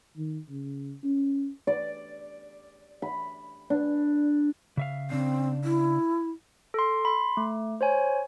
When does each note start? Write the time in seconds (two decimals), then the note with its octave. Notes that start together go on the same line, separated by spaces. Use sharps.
0.17 D#3
0.50 C#3
1.04 C#4
1.67 D5
3.02 B5
3.70 D4
4.77 C#3 E5 F5
5.10 C#3 C4 D4 F5
5.64 E4
6.74 A4 C6
7.05 B5 C6
7.37 A3
7.81 C5 C#5 G#5